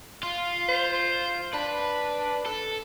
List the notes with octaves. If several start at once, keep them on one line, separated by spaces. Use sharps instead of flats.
F4
C5
D4 B4
A4